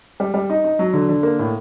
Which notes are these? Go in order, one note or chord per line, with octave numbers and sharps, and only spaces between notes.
G3
G3
D#4
D#4
F#3
D3
D3
A#3
A2